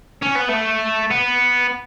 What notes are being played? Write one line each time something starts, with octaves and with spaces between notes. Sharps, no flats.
C#4
B3
A3
B3